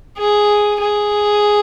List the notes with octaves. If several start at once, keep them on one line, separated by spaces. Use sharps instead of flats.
G#4
G#4